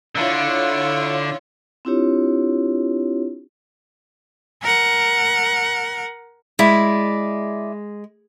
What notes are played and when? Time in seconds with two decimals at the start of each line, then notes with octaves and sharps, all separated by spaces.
0.15 D3 E4 F4 C#5
1.85 C4 D4 E4 F4 G4 C#5
4.62 A#4 F#5
6.59 G#3 E4 D5